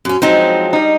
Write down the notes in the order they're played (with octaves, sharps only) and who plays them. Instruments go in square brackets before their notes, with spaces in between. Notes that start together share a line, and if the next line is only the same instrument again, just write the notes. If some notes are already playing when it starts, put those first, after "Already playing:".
[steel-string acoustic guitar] F#2 C#4
[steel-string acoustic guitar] F3 F#3 G#3 [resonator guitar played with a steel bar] C4 D#4
[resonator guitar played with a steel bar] G3 D#4